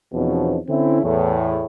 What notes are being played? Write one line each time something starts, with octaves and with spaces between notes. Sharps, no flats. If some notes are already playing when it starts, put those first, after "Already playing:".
E2 B2 F3 C4 C#4 D#4
D3 C4 C#4 E4
E2 A2